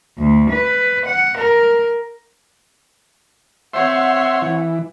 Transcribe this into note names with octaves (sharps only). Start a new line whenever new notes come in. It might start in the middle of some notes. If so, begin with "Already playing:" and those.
D2
B4
F#5
A#4
C4 C#5 E5 F#5 C6
E3